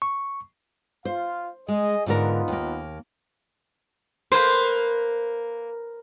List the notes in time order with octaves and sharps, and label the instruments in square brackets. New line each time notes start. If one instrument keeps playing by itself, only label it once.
[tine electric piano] C#6
[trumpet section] F4 F5 [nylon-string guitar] C5
[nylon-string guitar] G#3 [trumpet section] G#4 D#5
[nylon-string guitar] G#2 D3 A#4 [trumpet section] B3 D#4 F4
[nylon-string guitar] D#2 A#3
[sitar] A#3 [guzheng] B4 C5